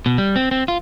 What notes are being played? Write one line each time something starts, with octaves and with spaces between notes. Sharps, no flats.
B2
G3
C4
C4
F4